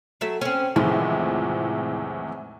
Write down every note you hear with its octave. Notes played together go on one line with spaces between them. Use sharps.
F#3 A3 E5
C4 C#4
E2 A2 C3 D#3 F3 G#3